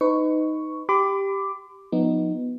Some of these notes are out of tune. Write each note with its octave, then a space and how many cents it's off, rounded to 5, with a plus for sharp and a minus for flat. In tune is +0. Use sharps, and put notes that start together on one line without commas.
D#4 +0 B4 +35 C#6 +5
G4 +0 B5 +40 D6 +0
F3 +30 B3 +0 D#4 +0